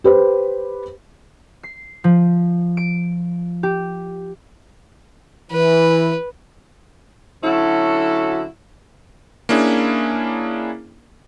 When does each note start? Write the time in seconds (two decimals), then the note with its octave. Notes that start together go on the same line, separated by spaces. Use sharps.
0.04 G4 B4 C5
1.63 C7
2.04 F3
2.77 D7
3.63 G4
5.51 E3 B4
7.43 D3 F#3 C#4 E4 F#4 A4
9.49 A#3 C#4 D4 E4 G#4